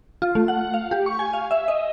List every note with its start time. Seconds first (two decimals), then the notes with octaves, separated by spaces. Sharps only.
0.22 F4
0.35 A3
0.48 F#5
0.74 F5
0.91 G4
1.06 C#6
1.19 G#5
1.33 F5
1.51 E5
1.68 D#5